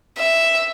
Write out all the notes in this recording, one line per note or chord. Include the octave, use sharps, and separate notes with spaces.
E5